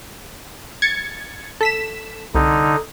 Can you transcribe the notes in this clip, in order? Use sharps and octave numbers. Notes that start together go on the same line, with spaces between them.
G#6 A6 C#7
A4 B6 E7
C2 D3 D#4